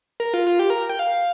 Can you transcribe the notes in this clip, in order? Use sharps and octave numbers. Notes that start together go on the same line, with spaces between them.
A#4
F4
F4
G4
A#4
G5
F5